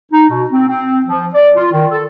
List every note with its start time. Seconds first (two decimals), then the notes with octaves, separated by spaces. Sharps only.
0.12 D#4
0.30 B2
0.51 C4
0.68 C4
1.07 F3
1.34 D5
1.56 F4
1.71 D#3
1.91 A4